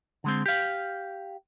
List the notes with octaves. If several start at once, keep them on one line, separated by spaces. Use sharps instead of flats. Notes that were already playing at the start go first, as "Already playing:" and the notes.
D3 G#3 C4
G4 F5